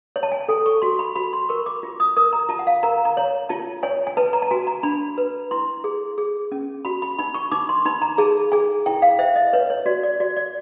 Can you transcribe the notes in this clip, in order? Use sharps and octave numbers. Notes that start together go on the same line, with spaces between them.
C#5
A5
G#5
A4 G#5
C#6
F#4 C6
B5
F#4 B5
C6
A#4 C#6
D6
F4
D#6
A#4 D#6
A#5
F4 A5
F#5
F5
A#4 A#5
A#5
C#5
F4 A5
C#5 G#5
G#5
B4 A5
A#5
A5
F#4 G#5
A#5
D4 B5
B4
E4 C6
G#4
G#4
C#4
F#4 B5
B5
D#4 B5
C#6
D#4 D6
C6
D#4 B5
A#5
G#4 A5
G#4 G#5
E4 G5
F5
C5 E5
D#5
B4 C#5
C#5
F#4 D5
D5
F#4 D5
D5